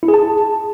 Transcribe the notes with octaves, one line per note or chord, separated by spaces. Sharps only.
E4
G#4
A5